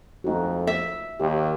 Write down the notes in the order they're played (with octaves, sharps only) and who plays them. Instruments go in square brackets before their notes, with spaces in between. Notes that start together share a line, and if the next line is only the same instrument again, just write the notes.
[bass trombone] F2 [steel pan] A3 D#4 F#4
[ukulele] E5
[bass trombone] D#2 [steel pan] G4